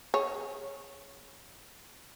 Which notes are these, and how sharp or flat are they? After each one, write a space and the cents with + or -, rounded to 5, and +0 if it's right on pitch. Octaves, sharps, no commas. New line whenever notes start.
G#4 +15 C#5 +0